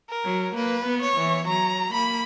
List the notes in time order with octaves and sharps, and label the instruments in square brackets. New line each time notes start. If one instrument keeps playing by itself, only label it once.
[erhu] A#4
[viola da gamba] F#3
[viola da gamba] A#3 [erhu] B4
[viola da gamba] B3
[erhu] C#5
[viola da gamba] E3
[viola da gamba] F#3 [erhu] A#5
[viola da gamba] A#3 [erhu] B5